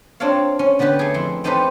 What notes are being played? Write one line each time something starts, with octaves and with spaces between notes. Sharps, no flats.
C4 D4 F4 A4 C#5 F5
C#4
D3 B3 F#4 G4 B4
A3 G#4
F2 E4 C6
C4 D#4 G4 A4 B4 C5